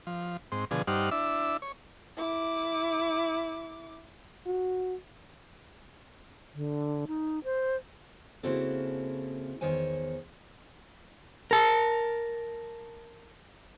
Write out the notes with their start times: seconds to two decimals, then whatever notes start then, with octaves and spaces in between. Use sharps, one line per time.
0.07 F3
0.52 G#2 C4 C6
0.71 B2 D3 F3 G#4
0.87 G2 G3 D#4 C5 F#5 F6
1.11 D4 E4 E5
1.62 C#5
2.17 E4 D6
4.46 F#4
6.55 D3
7.08 D#4
7.44 C5
8.43 C#3 A#3 C4 E4 F#4 A4
9.61 E2 D#3 C5 C#5 G#5
11.51 A#4 A5